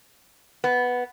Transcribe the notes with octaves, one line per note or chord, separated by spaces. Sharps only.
B3